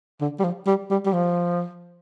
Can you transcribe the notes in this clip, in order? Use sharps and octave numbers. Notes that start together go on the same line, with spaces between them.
D3
G3
F3
G3
G3
G3
F3